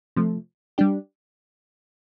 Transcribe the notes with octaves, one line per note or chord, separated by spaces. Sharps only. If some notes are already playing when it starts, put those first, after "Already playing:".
C3 F3 A3
G3 D4 G4